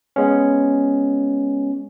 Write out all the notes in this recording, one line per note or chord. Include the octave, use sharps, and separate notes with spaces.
G#3 B3 C#4